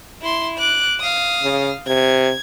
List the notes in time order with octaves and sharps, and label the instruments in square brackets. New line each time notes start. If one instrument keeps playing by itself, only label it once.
[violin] E4 C6
D6 F#6
F5 D#6
[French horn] C#3
[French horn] C3 [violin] G#6